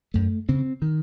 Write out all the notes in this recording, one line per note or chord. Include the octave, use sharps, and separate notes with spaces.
F#2 A3
C#3 C4
D#3